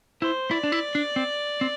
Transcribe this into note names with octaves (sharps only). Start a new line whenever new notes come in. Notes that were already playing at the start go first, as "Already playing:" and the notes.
E4 C5
E4 D5
D4
E4
D4
C4
C4